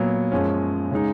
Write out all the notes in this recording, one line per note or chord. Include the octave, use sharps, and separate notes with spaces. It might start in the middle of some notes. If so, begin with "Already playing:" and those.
Already playing: A#2 F#3 B3
F#2 F3 G#3 C#4
C#3 G#3 D#4